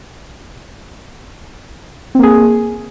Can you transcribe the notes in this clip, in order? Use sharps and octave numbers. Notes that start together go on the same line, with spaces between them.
A#3 C4 G#4